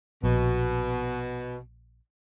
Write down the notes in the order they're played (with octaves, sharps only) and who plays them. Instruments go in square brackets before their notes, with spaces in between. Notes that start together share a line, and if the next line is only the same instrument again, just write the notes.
[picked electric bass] A#1 [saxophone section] B2